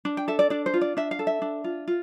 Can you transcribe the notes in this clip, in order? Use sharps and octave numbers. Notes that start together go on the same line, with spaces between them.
D4
G5
A4 E5
D5
D4 D5
C5
F4
D5
D4 E5
F5
A4
E5
D4
F4
F4